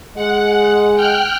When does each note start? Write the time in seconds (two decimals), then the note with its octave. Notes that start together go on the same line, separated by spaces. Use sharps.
0.16 G#3 G#4 F#5
0.96 G5 F6 F#6